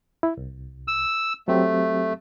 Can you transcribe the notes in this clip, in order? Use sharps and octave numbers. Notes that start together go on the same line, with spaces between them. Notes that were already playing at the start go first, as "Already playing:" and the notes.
E4
C2
E6
F#3 A3 C4 G4